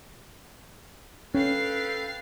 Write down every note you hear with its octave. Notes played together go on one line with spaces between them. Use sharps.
C#4 A4 B4 F5 G5 C7